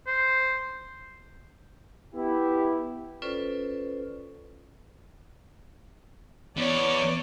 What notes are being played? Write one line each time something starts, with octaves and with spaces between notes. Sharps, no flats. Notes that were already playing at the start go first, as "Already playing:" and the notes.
C5
B3 E4 G4
C#4 F4 A4 B4 C5 D5
E2 C#5 D5